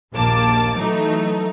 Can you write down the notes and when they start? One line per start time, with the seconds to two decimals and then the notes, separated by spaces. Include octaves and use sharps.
0.13 A#1 D#2 A#3 A5 D6
0.79 E3 F#3 A3 D#4